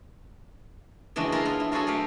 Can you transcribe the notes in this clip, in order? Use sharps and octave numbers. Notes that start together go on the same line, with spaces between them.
C#3 E3 G#3 D4 F#4
E4 F4 A#4 F5
B3 F4
E4
F#3 F4 F#4 G#4 A4
A3 G4 F5